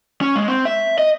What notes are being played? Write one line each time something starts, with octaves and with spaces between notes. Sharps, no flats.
C#4
G#3
C4
E5
D#5